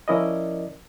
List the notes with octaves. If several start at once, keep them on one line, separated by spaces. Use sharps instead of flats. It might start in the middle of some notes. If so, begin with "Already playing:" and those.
F3 C#4 E4 A#4 D5 D#5